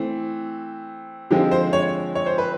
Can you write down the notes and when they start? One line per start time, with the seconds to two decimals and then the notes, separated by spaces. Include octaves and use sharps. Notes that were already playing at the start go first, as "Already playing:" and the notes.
Already playing: E3 A3 C4
1.31 D3 F3 G#3 C4 G4
1.51 C5
1.73 C#5
2.15 C#5
2.26 C5
2.38 B4